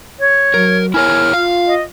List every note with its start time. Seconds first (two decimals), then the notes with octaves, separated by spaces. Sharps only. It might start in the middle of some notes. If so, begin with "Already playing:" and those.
0.20 C#5
0.54 F#3 A#4
0.94 E4 A#4 C#5 G#5 F6
1.33 F4 F5
1.67 D#5